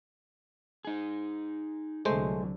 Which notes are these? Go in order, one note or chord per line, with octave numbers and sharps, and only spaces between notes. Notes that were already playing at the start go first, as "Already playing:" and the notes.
D#4 G#4
C2 D3 F#3 G#3 A3 C5